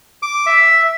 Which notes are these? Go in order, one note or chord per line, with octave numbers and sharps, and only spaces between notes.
D6
E5